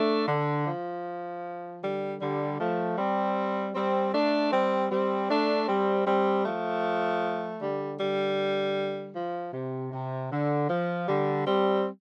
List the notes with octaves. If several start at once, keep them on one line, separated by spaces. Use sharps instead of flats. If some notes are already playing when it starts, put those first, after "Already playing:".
Already playing: A3 D4
D3
F3
D3 G3
D3 G3
F3 A3
G3 C4
G3 C4
A3 D4
G3 C4
G3 C4
A3 D4
G3 C4
G3 C4
F3 A3
D3 G3
D3 G3
F3
C3
C3
D3
F3
D3 G3
G3 C4